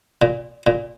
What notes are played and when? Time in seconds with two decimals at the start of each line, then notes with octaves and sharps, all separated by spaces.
0.22 A#2
0.67 A#2